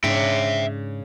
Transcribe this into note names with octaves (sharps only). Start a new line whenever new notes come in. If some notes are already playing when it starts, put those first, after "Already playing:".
G#2 C#3 D4 E5 G5